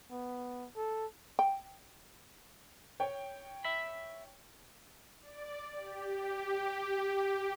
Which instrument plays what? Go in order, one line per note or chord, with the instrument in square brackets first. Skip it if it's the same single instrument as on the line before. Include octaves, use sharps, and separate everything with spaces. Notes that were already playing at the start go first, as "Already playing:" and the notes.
[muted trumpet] B3
A4
[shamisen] G5
[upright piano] C#5 G5
[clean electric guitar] E5 B5
[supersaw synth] D5
G4